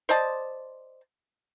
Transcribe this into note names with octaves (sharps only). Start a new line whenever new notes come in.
C5 D5 D#5 A5